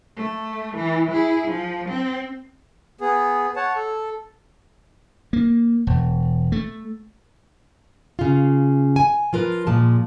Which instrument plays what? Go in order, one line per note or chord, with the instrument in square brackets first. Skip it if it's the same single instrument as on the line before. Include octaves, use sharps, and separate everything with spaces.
[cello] A3
E3
E4 G#4
F3
C4
[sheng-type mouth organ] B3 G#4
C#5 F#5 A5
A4
[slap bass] A#3
E1
A3
[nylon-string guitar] C#3 F4
G#5
F3 F4 A#4 B4
A#2 F3 G#3 A5